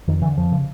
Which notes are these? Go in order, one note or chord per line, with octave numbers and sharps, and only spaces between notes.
F2 D#3
D3 E3
F2 F3
C#3